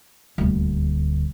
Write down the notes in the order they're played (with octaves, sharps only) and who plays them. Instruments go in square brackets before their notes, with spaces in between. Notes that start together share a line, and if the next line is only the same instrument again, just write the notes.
[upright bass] D#1 D2